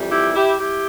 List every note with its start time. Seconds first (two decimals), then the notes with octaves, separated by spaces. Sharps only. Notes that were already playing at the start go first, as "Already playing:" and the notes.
Already playing: F2 E3 G3
0.11 E4 G4
0.35 E4 G4
0.60 E4 G4